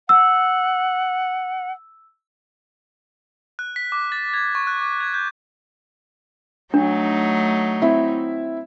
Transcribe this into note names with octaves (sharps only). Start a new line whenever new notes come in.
F#5 E6
F#6
B6
D6
A6
G#6
C#6
F#6
D6
G#6
G6
F#3 A3 D4 D#4
C4 E4 E5